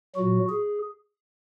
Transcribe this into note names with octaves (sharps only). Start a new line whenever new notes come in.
A#2 F#3 F#4
G#4